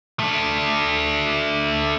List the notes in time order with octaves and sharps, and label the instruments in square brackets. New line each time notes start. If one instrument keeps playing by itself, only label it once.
[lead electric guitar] A3 D4